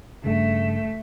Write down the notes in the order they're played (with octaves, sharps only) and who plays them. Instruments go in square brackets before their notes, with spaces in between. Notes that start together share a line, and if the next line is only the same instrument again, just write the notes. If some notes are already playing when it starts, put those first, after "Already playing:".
[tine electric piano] G2 C#3 [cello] A3